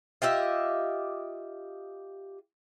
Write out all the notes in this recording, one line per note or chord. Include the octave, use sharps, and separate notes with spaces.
F4 G4 D#5 E5